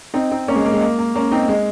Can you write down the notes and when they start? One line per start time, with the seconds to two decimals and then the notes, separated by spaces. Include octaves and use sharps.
0.14 C4 D#4
0.31 C4 D#4
0.48 A#3 C#4
0.56 G#3
0.65 A#3
0.73 G#3
0.81 A#3
0.99 A#3
1.15 A#3 C#4
1.31 C4 D#4
1.49 G#3